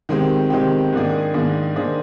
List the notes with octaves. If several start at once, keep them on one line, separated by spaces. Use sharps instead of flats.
D#3 G#3 C4 G4
D#3 G#3 C4 G4
G#2 D#3 A#3 D4 G#4
G#2 D#3 A#3 D4 G#4
D#3 A#3 D4 G#4 C5